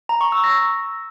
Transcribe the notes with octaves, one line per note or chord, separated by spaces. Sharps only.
A#5
C#6
E6
A#6